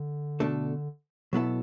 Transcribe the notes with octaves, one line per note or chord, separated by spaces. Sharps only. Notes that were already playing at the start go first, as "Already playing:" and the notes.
Already playing: D3
B2 A3 D4 A4
B2 F#3 B3 E4 A4